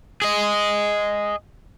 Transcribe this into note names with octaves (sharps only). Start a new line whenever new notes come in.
G#4 D#5